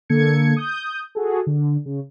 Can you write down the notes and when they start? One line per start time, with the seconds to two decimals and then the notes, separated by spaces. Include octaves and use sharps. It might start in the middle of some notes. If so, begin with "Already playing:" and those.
0.09 D3 A#3 A4 G#6 C#7
0.56 D#6 G6
1.15 F#4 G#4 A4
1.47 D3
1.86 C#3